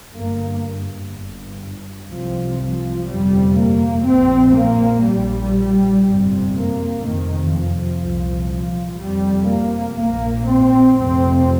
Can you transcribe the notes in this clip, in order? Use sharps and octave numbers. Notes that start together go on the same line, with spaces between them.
G1 G2 A#3
G1 G2
C2 C3 F3
F3
G1 F2 C3 G3
A#3
A#1 A#2 C4
A#3
A#1 A#2 G3
G1 F2 C3
A#3
F1 F2 C3 D#3
F3
C2 A#2
F3
F1 F2 C3 G3
A#3
A#1 A#2 A#3
C4
F1 F2 C3 C4